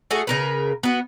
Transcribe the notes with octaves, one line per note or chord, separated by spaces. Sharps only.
A3 F#4 G#4
C#3 A#4 B4
B3 F#4